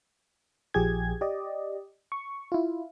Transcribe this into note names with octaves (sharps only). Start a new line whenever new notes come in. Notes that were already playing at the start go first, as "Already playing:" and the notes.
A#1 F3 G4 G#4 G#6
G4 D5 D#5
C#6
E4 F4